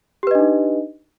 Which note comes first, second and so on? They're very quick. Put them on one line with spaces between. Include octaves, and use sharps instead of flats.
G4 B4 D#5 D4 D#4